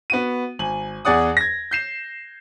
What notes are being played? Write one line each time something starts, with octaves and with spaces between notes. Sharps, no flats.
B3 F#4 D#7
G#1 G#5 F#7
E2 G#4 D5 F#5 D#6
G#6 A#6
G6 C7 E7